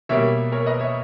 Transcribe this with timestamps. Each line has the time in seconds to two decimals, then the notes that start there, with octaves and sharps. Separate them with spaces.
0.09 B2 G3 A#3 C#5 E5
0.52 A#4 C#5
0.66 B4 D#5
0.79 C#5 E5